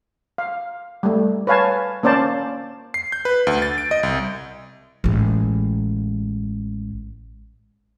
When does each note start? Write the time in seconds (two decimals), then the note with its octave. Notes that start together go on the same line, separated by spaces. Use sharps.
0.38 F5
1.03 G3 A3
1.47 B4 C#5 F5 G#5 A5
2.03 A#3 C#4 C5 D5 A5
2.94 C7
3.12 G6
3.25 B4
3.47 D2
3.62 A6
3.78 D7
3.91 D#5
4.03 C2
5.04 A1 G#3